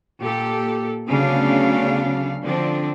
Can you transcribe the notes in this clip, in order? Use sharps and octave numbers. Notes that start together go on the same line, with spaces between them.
A#2 G4 A4
D2 C#3 F#3 B3 D4 F5
D3 F3 C4 D4